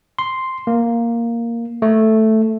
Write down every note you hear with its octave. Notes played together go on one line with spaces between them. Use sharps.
C6
A#3
A3